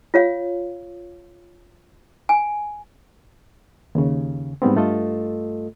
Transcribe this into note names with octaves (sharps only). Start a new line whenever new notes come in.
F4 C#5 F5
G#5
D#2 C#3
G#2 G3 B3 C4
G2 A3 F4 A4 D#5